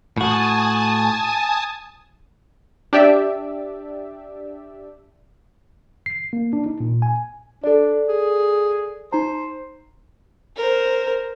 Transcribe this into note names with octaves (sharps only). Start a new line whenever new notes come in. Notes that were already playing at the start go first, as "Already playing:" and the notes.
A2 F#4 G#5 A5 D#6
D4 G4 D5 E5
C7
A#3
D4
D#4
A#2
G#5
D4 A4 D5
G#4
D#4 C5 A#5
A#4 C5